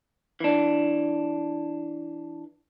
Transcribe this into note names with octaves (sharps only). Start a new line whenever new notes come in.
E3 D4